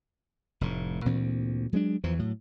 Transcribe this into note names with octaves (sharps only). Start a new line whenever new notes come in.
F1 A2
D2 A#2 E3 C4
F#3 G#3 C4 D4
E2 E3 F3
A2 F#3